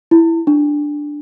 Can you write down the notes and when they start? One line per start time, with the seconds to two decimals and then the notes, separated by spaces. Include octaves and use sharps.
0.11 E4
0.47 D4